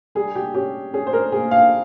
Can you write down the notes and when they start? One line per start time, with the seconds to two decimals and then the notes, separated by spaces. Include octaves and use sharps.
0.15 G3 G#4
0.35 G4
0.54 C#4 G4
0.93 C#4 G#4
1.07 C5
1.13 A#4
1.32 A#3 G#4
1.51 F5